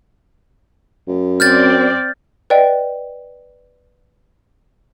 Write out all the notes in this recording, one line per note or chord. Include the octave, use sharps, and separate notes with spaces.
F#2
C4 D5 F6 G6 A6
B4 D5 D#5 G5